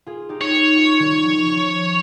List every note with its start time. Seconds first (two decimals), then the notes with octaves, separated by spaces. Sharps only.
0.06 F4 G#4
0.29 D#4 G4
0.41 C#5
0.52 D#4 G4
0.76 C#4 F4
0.99 D#3 G3
1.23 F3
1.46 F3